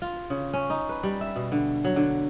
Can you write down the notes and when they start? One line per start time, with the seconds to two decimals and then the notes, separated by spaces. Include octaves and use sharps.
0.02 F4
0.30 C#3
0.53 C#4
0.70 D#4
0.89 B4
1.03 G3
1.21 E5
1.36 B2
1.52 D3
1.85 F#3
1.96 D3